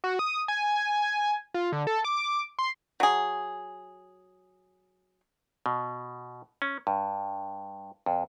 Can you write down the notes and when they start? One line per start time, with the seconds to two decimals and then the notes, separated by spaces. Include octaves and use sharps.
0.04 F#4
0.19 D#6
0.48 G#5
1.54 F4
1.72 D3
1.87 A4
2.05 D6
2.59 C6
3.00 F#3 G#4
5.66 B2
6.62 C#4
6.87 G2
8.06 F2